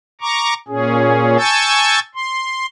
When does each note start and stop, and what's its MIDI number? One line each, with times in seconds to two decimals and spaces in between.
0.21 0.54 82
0.21 0.54 85
0.21 0.54 86
0.68 1.37 46
0.68 1.37 61
0.68 1.37 68
1.38 1.99 80
1.38 1.99 81
1.38 1.99 85
1.38 1.99 88
1.38 1.99 91
1.38 1.99 93
2.15 2.66 84